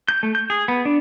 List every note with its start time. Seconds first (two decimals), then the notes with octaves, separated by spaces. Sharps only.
0.08 G6
0.23 A3
0.35 G6
0.50 G#4
0.68 B3
0.85 D4